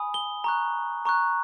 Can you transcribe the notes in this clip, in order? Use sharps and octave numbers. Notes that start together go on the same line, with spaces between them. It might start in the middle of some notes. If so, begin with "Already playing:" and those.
Already playing: G#5 B5 D#6
G7
A#5 C#6 F#6
A#5 C#6 F#6